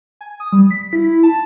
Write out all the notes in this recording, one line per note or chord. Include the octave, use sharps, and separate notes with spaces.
G#5
D#6
G3
B6
E4
A5